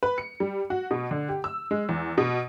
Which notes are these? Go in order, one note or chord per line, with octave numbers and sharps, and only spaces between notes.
B4
C#7
G3
F#4
B2
D3
G4
E6
G#3
E2
B2